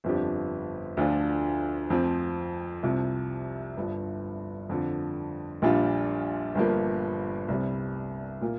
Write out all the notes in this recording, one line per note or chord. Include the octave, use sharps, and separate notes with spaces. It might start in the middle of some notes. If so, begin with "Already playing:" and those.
G1 F2 F3 D4 G4
D2 D3 F3 D4 F4
F2 F3 C4
C2 C3 F3
G1 G2 F3
F2 D3 F3
A#1 A#2 G3 D4 F4
G1 G2 F3 A#3
C2 C3 G3
A#2 A#3 F4